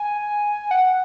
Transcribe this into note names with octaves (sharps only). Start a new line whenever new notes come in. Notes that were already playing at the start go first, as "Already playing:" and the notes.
Already playing: G#5
F#5